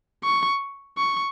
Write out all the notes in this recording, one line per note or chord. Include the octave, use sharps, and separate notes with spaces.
C#6
C#6